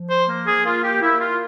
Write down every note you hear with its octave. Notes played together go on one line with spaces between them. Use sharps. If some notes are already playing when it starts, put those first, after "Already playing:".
Already playing: F3
C5
A#3
G#4
A#3 F4
G4
A#3 E4
F4